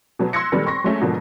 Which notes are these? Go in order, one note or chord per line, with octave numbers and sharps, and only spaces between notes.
B2 F#3 B3
C6 E6 F#6 G#6 A#6 C#7
A#2 D#3 F#3 G3 B3 A4
C4 C6 C#6 A#6
F#3 G#3 A3 C#4
G#2 B2 D3 F3 F#3 A#3